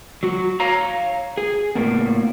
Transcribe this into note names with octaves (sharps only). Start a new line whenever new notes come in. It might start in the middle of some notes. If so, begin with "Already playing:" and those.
F#3 F#4
C#5 F5 A#5
G#4
A2 A#3 B3